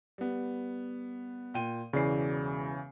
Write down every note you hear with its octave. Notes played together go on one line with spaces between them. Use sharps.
G3 B3
A#2 G5 D#7
E1 C#3 E3 D5 C7